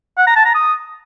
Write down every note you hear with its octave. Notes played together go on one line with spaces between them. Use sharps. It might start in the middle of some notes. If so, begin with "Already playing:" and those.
F#5
A#5
A5
A#5
D#6